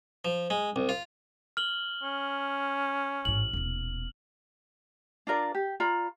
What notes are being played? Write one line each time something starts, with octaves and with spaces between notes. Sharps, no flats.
F3
G#3
C2
F4
F6 F#7 G7
C#4
A1 G#2 F#7
D#1 B2
D4 F4 A#4 D5
G4
F4 D5 A#5 B5